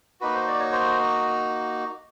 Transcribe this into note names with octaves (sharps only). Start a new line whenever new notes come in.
A#3 D#4 F#4 B4
C5
D5
C#5
C5